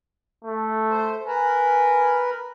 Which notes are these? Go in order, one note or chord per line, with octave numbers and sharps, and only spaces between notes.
A3
C5
A#4 B4 G#5